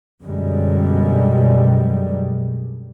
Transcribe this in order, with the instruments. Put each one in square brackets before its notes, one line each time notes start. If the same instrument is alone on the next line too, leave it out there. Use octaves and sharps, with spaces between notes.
[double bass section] F#2 B2 D3 G3 G#3